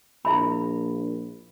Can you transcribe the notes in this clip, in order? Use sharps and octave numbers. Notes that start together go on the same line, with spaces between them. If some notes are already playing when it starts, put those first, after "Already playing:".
A#1 E4 E5 B5